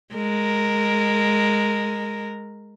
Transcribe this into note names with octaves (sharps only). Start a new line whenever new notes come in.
G#3 A#4